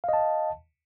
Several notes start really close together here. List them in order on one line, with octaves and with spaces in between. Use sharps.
F5 D#5 A5